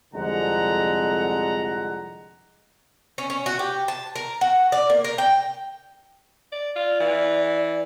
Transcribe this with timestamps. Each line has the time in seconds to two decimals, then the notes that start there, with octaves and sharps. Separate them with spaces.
0.14 C2 F2 D3 G#3 F#5 A#5
3.18 C#4
3.30 C#4
3.46 F#4
3.59 G4
3.88 A5
4.16 A#4
4.41 F#4
4.72 D5
4.90 A#3
5.04 A#4
5.18 G5
6.52 D5
6.76 F4 D5
7.00 E3